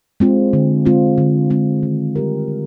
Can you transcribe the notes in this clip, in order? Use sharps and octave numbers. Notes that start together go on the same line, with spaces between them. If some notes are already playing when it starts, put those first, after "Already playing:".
G#3 C4 F4
D3
G#3 C4 F4
D3
G#3 C4 F4
D#3
G3 C4 G4 A#4
D#3